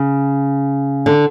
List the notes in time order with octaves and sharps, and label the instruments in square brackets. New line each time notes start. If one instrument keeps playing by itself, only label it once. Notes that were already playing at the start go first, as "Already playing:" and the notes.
Already playing: [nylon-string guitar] C#3
D3